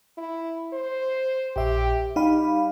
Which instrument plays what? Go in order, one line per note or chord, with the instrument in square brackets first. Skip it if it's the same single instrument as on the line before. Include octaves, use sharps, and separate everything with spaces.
[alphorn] E4
C5
[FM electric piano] A#1 E5 [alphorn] G4
[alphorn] G3 [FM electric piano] D#4 F5 B5